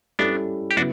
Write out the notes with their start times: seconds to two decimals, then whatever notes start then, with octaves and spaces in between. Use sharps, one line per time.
0.19 G3 B3 C#4 D4 E4 A4
0.71 G4
0.77 C#3 F#3 B3 D4 E4 F#4